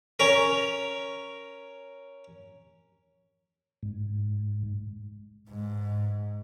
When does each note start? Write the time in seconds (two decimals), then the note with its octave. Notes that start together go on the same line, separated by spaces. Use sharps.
0.20 C#4 A#4
3.83 G#2
5.50 G#2